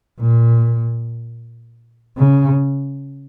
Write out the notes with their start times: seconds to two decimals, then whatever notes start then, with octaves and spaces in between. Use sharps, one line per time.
0.20 A#2
2.18 C#3